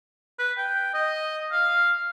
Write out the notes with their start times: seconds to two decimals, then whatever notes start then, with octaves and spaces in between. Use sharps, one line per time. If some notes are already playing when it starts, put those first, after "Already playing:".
0.39 B4
0.58 G5
0.94 D#5
1.52 F5